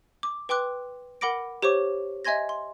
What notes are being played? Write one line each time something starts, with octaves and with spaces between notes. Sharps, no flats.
D6
B4 G5 C6 D6 F#6
A#4 F#5 B5 D6 A#6 D7
G4 C5 C#5 C#6 D6
D#5 E5 G#5 C6 G#6 A#6
C6